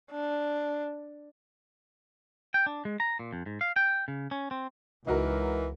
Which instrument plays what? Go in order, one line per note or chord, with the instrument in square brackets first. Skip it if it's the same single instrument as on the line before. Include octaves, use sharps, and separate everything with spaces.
[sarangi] D4
[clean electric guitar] G5
D4
G#3
A#5
A#2
F2
G#2
F5
G5
C#3
C#4
C4
[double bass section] C#2 [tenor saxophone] E3 [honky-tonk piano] D#4 F#4 A#4